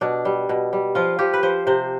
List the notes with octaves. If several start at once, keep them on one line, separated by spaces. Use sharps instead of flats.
B2 D4
G3
B2
G3
F3 F4
F3 G4
B4
F3 C5
C3 C5